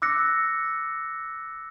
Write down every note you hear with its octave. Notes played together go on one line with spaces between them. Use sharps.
D6 E6 F#6 A#6 C#7